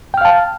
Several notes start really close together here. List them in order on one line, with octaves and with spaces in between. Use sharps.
G5 F6 F5 A5